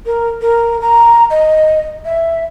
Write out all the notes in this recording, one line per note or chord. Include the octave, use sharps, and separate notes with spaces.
A#4
A#4
A#5
D#5
E5